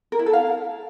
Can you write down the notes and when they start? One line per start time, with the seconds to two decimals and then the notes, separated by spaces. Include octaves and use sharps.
0.12 A#4
0.19 E4
0.26 A4
0.33 F5